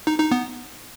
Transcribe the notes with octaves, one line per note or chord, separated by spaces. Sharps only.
D#4
D#4
B3